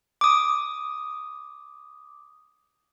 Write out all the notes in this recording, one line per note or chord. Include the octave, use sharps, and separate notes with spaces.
D6 D#6